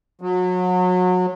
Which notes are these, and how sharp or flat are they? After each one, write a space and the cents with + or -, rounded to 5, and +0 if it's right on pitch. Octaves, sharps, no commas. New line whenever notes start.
F#3 -30